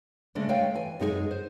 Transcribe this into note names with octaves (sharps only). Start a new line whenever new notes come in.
C#3 G#3 A3 C#4 D4
G#3 A3 C#5 F5 G5 G#5
E3 G#5
F#2 G#3 D#4 E4 G#4 G#5
C5